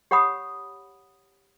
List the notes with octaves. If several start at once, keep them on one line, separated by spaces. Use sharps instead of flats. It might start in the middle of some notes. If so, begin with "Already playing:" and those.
G4 C#5 F#5 B5 D#6